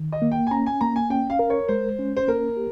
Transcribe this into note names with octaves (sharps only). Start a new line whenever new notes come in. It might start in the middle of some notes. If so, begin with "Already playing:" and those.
Already playing: D#3
D#5
A#3
G5
G#5
C#4 A#5
G#5
A#3 A#5
G#5
C#4 G5
F5
A#4
C#5
G#3 C5
C#4
C5
A#3 A#4
G4